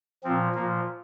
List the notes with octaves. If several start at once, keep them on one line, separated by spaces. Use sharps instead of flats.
A#2 F3 C4
A#2 F3 A#3